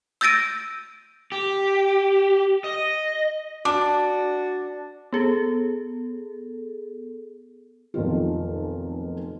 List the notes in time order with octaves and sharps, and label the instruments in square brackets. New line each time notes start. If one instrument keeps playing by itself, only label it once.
[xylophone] E6 G6 A6 A#6 D7 D#7
[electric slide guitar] G4
D#5
[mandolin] D4 [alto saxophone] F#4 [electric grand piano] D6
[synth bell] B3 G#4 A4
[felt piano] F1 B1 D#3 F4